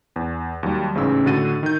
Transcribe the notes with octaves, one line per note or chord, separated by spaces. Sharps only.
E2
D#2 F#3 G3
A1 G#2 C#3 E6
A2 D3 F#4 A6 D#7
D#3 G6